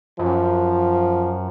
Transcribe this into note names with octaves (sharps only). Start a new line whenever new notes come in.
F#2 F3